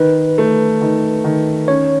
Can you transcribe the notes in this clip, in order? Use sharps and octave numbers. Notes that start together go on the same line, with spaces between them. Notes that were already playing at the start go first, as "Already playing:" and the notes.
Already playing: D#3 B4
A3
D#3
D#3
C#4 C#5